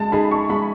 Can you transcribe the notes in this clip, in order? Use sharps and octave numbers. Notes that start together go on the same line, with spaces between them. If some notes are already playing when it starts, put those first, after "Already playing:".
Already playing: G#3 A5
D#4 G#4 B5
C#6
G#3 B5